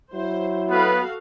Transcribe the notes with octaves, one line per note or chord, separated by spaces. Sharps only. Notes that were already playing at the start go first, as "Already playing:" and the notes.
F#3 E4 C5
B3 F#4 A4 B4 F5